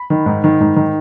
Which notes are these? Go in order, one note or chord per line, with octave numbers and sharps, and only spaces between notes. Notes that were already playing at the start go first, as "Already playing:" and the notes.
Already playing: B5
D#3
G#2
D#3
G#2
D#3